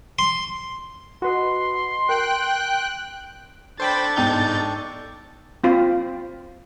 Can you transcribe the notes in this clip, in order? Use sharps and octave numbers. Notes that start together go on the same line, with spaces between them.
C6
F#4 B4 D#5 C6
A#4 G5 F#6
D4 A4 C5 G5 B5 C#6 A6
G#2 B3 D#4 G5 A5 G6
C4 F4 C5